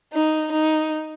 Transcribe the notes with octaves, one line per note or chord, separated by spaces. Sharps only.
D#4
D#4